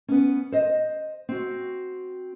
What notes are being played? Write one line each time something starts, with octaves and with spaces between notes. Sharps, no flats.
B3 C#4
C5 D#5
C4 F#4